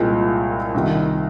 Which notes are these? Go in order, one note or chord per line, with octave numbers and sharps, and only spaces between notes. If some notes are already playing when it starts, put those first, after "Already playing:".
Already playing: C2 A#2 G#3 C4 F4
C2 C3 D#3